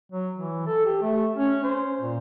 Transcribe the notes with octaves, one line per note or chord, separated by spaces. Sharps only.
F#3
E3
A4
G4
A3
C#4
C5
A#2